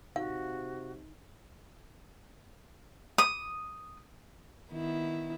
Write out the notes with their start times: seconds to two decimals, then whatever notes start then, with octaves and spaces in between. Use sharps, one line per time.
0.16 C3 D#4 F#4 F5
3.18 D#6
4.70 D#3 B3 E4